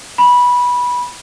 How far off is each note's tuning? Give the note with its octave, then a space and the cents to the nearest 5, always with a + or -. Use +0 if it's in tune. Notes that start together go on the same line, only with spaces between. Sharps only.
B5 -15